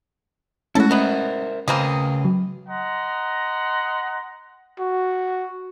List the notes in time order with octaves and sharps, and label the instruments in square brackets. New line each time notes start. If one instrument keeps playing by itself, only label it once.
[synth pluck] G#3 A3 C#4 [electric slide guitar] E4 [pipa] F#4 A4
[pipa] D#3 B3 [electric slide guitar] A#4 C5 E5
[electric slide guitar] C#3 B4 [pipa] A#3 C4 G#4
[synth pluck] F#3
[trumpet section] D#5 F#5 A#5 C6
[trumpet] F#4